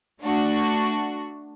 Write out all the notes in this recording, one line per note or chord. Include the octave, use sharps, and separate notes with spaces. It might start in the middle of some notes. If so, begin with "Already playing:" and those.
A3 D4 F#4